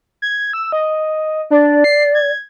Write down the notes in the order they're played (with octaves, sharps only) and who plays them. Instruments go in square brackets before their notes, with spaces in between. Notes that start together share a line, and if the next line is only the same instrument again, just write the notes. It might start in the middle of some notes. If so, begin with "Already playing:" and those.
[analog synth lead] G#6
E6
D#5
[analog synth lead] D4 [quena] D5
[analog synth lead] C7
G#6